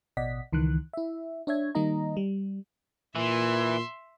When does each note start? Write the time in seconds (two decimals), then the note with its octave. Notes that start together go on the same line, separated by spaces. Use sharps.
0.17 A1 B2 D5 D#5 F#5 B6
0.53 C#2 D#3 E3 F#6
0.93 E4 E5
1.47 D4 C#5 E5 G#6
1.75 D#3 G3 A#3 D#4 D#5 A#5
2.17 G3
3.16 A#2 E3 E5 C6